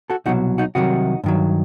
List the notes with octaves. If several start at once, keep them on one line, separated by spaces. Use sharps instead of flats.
F#4 A4
C2 B2 F#3 D#4 F#4
D#4 F#4
C2 C3 D#3 F#3 D#4 F#4
G2 D#3 F#3